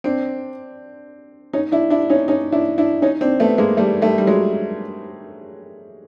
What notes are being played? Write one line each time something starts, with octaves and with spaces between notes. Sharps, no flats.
C4 D4
C#4 D#4
D4 E4
D4 E4
C#4 D#4
C#4 D#4
D4 E4
D4 E4
C#4 D#4
C4 D4
A3 B3
G#3 A#3
G3 A3
G3 A3
G3
F#3 G#3